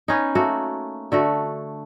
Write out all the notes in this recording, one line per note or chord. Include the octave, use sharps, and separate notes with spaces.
B3 C#4 D#4
A3 A#3 F#4
D3 A3 F#4